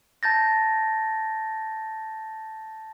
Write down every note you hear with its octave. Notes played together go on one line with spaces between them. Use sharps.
A5 G6 A6 A#6